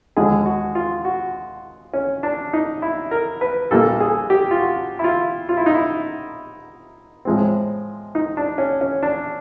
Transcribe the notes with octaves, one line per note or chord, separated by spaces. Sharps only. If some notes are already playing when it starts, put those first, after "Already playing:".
D#2 D3 F3 G#3 G#4
F#4
F4
F#4
C#4
D4
D#4
E4
A#4
B4
A#1 A#2 G3 A#3 A4
G#4
G4
F4
F#4
E4
F4
F4
E4
D#4
E4
A2 F3 G#3 C4
D#4
D4
C#4
C#4
D4